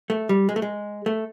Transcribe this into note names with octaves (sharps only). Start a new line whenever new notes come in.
A3
G3
G#3
A3
G#3
A3